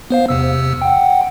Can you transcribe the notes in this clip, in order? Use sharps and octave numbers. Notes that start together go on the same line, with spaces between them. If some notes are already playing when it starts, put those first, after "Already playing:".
B3 C5 F5
E2 C3 E6
F#5 G5